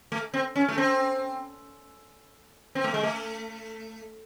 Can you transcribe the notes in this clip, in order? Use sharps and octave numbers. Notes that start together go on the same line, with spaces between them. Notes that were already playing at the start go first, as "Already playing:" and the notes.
A3
C4
C#4
A3
C4
C4
A3
G#3
A3